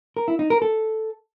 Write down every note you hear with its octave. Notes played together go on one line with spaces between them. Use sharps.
A#4
E4
D#4
A#4
A4